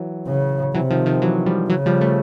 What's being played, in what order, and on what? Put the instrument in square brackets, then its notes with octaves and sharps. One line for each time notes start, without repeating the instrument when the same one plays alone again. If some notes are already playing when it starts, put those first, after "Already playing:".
Already playing: [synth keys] E3 F#3
[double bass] C#3
[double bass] C3 [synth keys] E3 F#3
[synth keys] D#3 F3
D#3 F3
E3 F#3
F3 G3
[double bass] C#3 [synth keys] E3 F#3
[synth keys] F3 G3
G3 A3